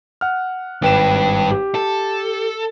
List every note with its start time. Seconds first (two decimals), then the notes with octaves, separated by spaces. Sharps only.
0.21 F#5 F6
0.82 G#1 G2 G4 B4 E7
1.51 G4
1.75 A4